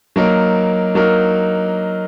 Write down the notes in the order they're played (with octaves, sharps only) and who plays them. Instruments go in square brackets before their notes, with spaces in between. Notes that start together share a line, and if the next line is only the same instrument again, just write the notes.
[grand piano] F#3 A#3 D#4 A#4
F#3 A#3 D#4 A#4